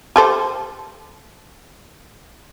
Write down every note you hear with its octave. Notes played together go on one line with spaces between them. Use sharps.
G4 A4 C5